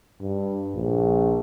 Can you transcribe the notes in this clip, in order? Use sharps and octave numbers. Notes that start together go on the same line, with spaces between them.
G2
A#1